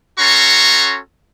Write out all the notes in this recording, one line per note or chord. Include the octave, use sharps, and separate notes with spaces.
C#4 F#4 A4 A#5 C6 C#6